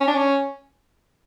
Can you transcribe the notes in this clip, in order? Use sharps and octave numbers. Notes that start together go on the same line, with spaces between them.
C#4
D4
C#4